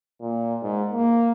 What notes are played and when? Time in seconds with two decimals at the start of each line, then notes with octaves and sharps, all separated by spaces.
0.21 A#2
0.62 G#2
0.92 A#3